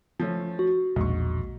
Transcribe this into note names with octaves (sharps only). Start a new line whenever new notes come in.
F3 A3 C#4
F#4
E1 A#1 G#2 C#6